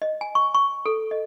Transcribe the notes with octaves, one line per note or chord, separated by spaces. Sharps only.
D#5
G#5
C#6
C#6
A4
D#5